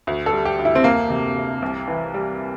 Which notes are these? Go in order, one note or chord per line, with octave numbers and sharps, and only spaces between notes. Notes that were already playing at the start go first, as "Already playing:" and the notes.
D2
A4
G3
G4
D2
E4
C4
F1 A#3
C3
F1
C2
E3
G3